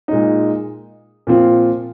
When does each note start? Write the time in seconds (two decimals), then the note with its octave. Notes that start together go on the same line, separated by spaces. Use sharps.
0.08 A#2 G#3 D#4
1.27 A#2 F3 C4 F4